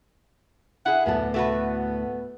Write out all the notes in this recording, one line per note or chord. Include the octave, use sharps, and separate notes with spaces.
E4 G#4 F#5
D2 A2 B3 A4
A3 F#4 B4